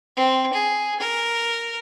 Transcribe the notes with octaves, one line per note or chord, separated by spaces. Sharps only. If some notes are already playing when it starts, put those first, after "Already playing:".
C4
G#4
A#4